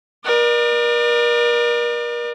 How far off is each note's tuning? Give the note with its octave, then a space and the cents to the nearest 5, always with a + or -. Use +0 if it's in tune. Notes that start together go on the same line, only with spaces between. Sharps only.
A#4 +35 D5 +40